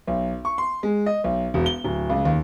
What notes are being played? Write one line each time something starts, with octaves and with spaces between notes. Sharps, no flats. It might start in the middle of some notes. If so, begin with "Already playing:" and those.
B1
C#6
C6
G#3
D#5
B1
E1
G7
D1
C#2
D#2